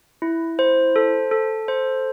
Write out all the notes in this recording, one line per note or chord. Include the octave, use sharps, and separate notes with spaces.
E4
C5
A4
A4
C5